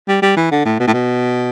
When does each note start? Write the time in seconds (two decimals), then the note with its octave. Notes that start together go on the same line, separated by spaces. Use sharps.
0.08 G3
0.22 G3
0.37 E3
0.51 D3
0.65 A2
0.80 B2
0.87 A2
0.93 B2